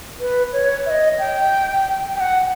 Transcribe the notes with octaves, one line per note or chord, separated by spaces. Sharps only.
B4
C#5
E5
D#5
G5
G5
F#5